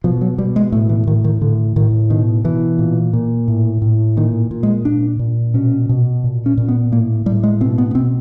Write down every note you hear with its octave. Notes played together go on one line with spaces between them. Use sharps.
B2 F3
F#3
B2 G3
G#3
A2 A3
E3
A2 D#3
D#3
A2 D3
A2 D#3
B2 D#3
B2 E3
A#2
A#2
A2
A2
A#2 D#3
A#2
G#3
A#2 D4
A#2
B2 C#4
B2
A#2
C#4
A#2
B3
A2 A#3
A2 G3
G#3
B2 C4
B3
B3
B2 C4